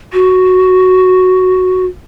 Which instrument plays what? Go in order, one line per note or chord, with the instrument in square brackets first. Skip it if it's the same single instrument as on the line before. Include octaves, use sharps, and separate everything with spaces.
[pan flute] F#4